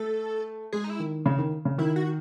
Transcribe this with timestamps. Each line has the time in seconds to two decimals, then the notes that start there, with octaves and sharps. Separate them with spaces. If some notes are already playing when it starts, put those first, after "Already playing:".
Already playing: A3 A4
0.73 G#3 G#4
0.84 D#4
0.90 E4
1.00 D#3
1.26 C#3
1.38 D#3
1.65 C#3
1.78 D#3 E4
1.96 F#4